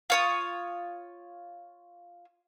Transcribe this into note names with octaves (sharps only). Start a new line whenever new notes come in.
F4 C#5 D#6